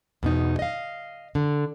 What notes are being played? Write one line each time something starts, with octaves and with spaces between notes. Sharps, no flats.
E2 B2 D#4
D#5 F5
D3